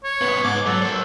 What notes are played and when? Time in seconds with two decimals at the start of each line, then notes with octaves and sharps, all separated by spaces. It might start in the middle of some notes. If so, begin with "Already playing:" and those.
0.04 C#5
0.22 C#3 B3
0.43 G#2 D6
0.66 F#3 A4
0.82 A#4 C5